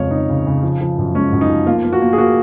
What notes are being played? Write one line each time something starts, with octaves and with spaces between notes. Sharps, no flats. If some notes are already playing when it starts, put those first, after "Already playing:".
Already playing: F2 C#3 G#3 C#5 F5
C#3 D#4
C#3
C#3
F3
F3
F#2
G#3 C#4
F#2
D#4
F3
A#3 F4
A#3
F#4
A#3
G#4
A#3 F#4